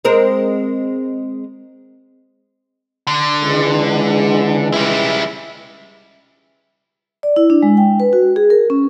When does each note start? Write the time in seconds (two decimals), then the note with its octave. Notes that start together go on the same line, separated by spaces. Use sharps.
0.05 G#3 C4 A#4
3.07 D3
3.42 C#2 E3 G#3
4.74 G3 E4
7.23 D5
7.36 E4
7.50 D4
7.62 G#3
7.77 G5
8.00 B4
8.13 F#4
8.36 G#4
8.50 A#4
8.70 C#4